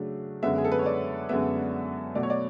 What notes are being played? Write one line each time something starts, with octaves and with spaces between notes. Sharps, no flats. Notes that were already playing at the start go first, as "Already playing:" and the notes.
Already playing: C#3 F#3 A3 D4
F#2 D3 G#3 B3 E5
G#4
A4
B4
C#5
D5
F#2 D3 G#3 B3 E5
B2 F#3 A3 D5
C#5
D5